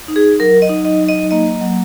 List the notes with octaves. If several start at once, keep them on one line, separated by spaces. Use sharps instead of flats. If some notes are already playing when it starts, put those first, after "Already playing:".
D#4
G#4
F#3 A#4
D#5
D#4
D#5
F#3
D#5
A#3 D#5
F#3